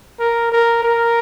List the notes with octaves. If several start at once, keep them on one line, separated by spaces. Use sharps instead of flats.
A#4
A#4
A#4